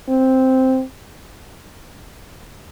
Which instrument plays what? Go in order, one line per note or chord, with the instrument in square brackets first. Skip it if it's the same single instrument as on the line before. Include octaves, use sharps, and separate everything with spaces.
[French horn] C4